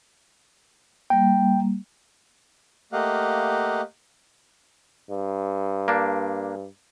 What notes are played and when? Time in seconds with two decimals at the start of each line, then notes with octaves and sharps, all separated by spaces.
1.10 G3 A#3 G5
2.93 A3 A#3 G4 D#5 F5 F#5
5.10 G2
5.88 A#3 D4